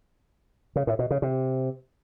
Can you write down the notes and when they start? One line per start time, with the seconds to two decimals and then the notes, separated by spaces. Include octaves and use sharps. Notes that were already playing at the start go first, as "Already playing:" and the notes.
0.76 C#3
0.87 A2
0.99 B2
1.11 C#3
1.22 C3